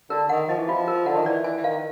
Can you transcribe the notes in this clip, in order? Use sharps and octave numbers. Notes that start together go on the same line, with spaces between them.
D3 A#4
D#3 F#5
F3 D#5
E3
F3 F4
A#4
D3 F#5
D#3
E3 D5
E3 G#5
E3
D#3 F5